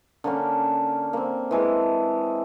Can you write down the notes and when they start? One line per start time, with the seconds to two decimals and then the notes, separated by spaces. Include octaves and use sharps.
0.24 D3 A#3 C#4
1.13 A#3 C4
1.51 E3 G#3 A4